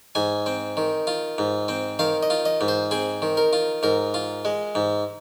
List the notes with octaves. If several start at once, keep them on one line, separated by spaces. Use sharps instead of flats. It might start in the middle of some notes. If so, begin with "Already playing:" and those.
G#2 G#5
C4
D#3
F4
G#2
C4
D#3 F5
D#5
F4
D#5
G#2
C5
C4 G#4
D#3
A#4
F4
G#2 A#4
F4
G#3
G#2